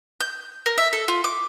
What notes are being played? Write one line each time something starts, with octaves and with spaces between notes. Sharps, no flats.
G6
A#4
E5
A4
F4
D6